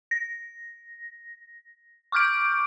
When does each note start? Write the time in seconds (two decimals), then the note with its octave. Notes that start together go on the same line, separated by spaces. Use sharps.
0.11 A#6
2.12 C#6 D6 F6 G6 D7